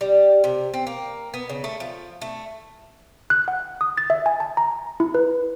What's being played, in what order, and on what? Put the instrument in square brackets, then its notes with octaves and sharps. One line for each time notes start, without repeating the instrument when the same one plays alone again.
[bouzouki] G3
C3
C4
A#3
B3
C#3
A3
F3
A3
[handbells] F#6
F#5
D#6
A6
E5
G#5
A5
A#5
E4
B4